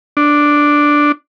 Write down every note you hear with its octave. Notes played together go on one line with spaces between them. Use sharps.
D4